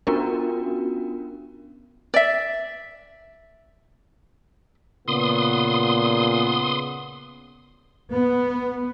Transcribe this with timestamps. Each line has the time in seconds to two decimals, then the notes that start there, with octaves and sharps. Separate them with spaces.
0.07 B3 C#4 D4 F4 F#4 A#4
2.14 D5 E5
5.08 A#2 C#3 B3 C6 D#6
8.13 B3